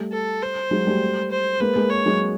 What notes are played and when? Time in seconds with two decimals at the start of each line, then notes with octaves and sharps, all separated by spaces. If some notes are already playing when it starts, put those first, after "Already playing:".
Already playing: G3 A3
0.12 A4
0.42 C5
0.71 F#3 G#3
0.86 G3 A3
1.31 C5
1.60 G#3 A#3 B4
1.76 G#3 A#3
1.90 C#5
2.06 F#3 G#3